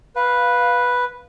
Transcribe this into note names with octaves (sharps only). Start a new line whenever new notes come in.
B4 F5